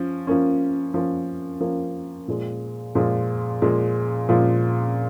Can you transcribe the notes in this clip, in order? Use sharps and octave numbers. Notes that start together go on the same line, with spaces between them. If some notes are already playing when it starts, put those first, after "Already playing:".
Already playing: F3 C#4
F3 A#3 C#4
F3 A#3 C#4
F3 A#3 C#4
A#2 F3 G#3
A#2 F3 G#3
A#2 F3 G#3
A#2 F3 G#3